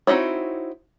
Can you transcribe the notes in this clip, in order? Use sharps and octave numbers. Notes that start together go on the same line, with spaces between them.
C4 D#4 E4 F#4 C#5